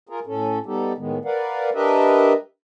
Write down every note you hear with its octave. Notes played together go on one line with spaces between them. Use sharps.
F4 G#4 A#4
A2 C#4 A4
G3 B3 D#4 G4 A4
A2 D#3 G#3 B3
A#4 B4 D5 F5 F#5
D4 G4 A#4 B4 D#5 E5